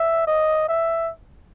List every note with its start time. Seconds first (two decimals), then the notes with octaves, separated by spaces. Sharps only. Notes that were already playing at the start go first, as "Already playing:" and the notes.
Already playing: E5
0.27 D#5
0.68 E5